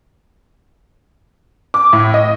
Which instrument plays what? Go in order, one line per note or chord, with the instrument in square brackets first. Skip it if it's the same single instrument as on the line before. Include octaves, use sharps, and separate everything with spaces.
[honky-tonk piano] D6
A2
D#5